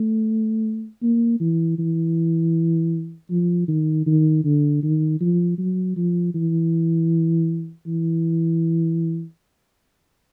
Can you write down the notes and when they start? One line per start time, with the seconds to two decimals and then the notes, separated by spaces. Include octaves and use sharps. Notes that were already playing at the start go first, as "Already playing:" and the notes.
Already playing: A3
1.03 A#3
1.40 E3
1.79 E3
3.30 F3
3.68 D#3
4.06 D#3
4.44 D3
4.83 D#3
5.20 F3
5.58 F#3
5.97 F3
6.35 E3
7.87 E3